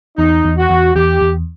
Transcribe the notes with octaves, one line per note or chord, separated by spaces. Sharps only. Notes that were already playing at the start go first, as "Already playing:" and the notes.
E2 D#4
E2
F#4
E2
E2 G4
E2